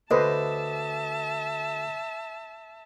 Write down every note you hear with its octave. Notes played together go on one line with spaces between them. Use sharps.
D2 B4 C5 D#5 E5 A5